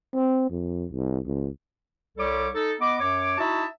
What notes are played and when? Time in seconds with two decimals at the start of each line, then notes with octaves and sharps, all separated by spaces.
0.14 C4
0.50 F2
0.92 C2
1.25 C#2
2.17 C2 G3 A4 C#5 D6
2.54 D#4 A4
2.80 B3 D#5 D6
2.99 F#2 C#5 D6
3.38 D#4 E4 F#4 E5 A5